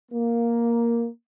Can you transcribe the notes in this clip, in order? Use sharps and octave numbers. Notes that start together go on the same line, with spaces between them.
A#3